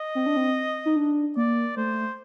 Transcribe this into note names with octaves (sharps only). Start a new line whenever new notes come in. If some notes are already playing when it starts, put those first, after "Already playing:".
Already playing: D#5
C4
D4
C4
D#4
D4
A#3 D5
A3 C5